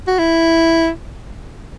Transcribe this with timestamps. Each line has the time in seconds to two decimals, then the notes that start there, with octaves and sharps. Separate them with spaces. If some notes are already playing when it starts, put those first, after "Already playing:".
0.07 F#4
0.19 E4